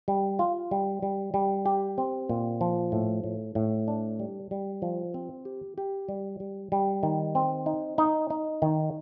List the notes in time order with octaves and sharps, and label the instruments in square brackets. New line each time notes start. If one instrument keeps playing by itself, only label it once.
[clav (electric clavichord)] G3
F4
G3
G3
G3
G4
C4
A#2
F3
A2
A2
A2
D4
G3
G3
F3
C4
G4
G4
G3
G3
G3
D#3
C4
D#4
D#4
D#4
D#3